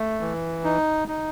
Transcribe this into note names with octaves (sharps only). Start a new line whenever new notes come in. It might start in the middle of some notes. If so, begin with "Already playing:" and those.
Already playing: A3
E3
D#4
D#4